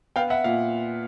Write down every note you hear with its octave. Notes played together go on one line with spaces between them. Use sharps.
B3 F5 G5
E5 F#5
A#2 F5